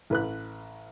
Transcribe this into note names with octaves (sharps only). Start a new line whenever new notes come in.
A1 B4 F#6